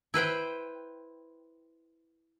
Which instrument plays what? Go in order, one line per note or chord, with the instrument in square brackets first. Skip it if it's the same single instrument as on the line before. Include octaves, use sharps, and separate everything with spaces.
[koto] E4 B4 C5 G5